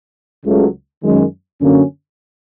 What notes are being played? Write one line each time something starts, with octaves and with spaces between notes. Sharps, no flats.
C#2 C#3 F#3 A3
F#2 D#3 G#3 C#4
F#2 D3 F#3 A#3 C#4